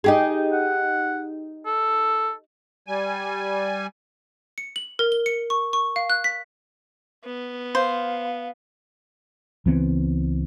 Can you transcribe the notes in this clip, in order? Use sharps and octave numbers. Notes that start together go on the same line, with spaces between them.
D#4 G4 G#4
F#5
A4
G3 G#5
C#7
F#7
A#4
G7
C#7
C#6
C#6
F5
F#6
B6
B3
C5 F5
C#2 E3 B3 C4